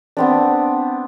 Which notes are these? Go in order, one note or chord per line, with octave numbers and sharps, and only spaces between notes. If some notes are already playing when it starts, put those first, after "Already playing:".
B3 C4 D4